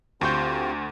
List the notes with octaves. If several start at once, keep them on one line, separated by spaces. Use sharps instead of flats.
D2 C4 F4 G4 C6 C#6 G6